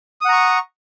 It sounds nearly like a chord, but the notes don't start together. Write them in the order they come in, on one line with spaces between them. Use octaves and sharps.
D#6 F#5 A#5 C#6